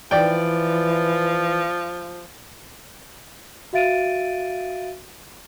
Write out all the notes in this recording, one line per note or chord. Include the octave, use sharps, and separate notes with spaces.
E3 F3 D5 G5
F#4 E5 F5 A6 D7 D#7